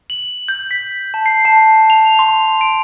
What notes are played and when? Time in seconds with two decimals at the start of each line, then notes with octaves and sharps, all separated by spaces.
0.10 F#7
0.48 G6
0.71 B6
1.14 A5
1.26 C7
1.45 A5
1.90 F7
2.19 C6
2.61 D7